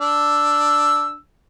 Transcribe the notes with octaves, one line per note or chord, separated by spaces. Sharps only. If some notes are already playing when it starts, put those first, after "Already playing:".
D4 E6